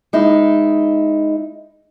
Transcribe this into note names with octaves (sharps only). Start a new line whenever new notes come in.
G#3 D#4 E4